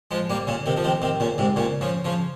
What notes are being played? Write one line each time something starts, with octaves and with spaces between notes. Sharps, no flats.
F3 G#3
G3 A#3
A#2 C#3
C3 D#3
F3
C3 D#3
C3 D#3
A#2 C#3
G#2 C3
A#2 C#3
C#3 F3
C#3 F3